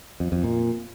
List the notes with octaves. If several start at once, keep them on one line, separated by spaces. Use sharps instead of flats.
F2
F2
A#2